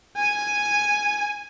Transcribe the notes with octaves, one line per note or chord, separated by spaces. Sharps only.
G#5